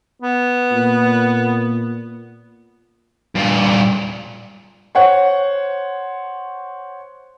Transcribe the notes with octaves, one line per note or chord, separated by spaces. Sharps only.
B3
A#2
G2 A#2
C5 C#5 F#5 C#6